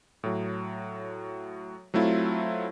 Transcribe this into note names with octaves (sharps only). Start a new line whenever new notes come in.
A2 F#3
F#3 A3 C4 E4 F4